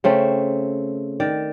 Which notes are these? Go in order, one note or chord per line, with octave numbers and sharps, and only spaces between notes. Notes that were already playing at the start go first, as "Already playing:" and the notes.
C#3 A3 C4
D#3 D5